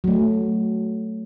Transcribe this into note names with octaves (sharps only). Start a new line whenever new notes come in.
F#3 A3